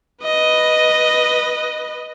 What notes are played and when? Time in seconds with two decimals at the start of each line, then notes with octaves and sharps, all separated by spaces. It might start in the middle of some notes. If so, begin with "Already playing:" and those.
0.24 B4 D#5